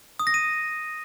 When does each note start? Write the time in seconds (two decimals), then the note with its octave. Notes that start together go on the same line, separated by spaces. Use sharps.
0.20 D#6
0.27 A#6
0.34 D#7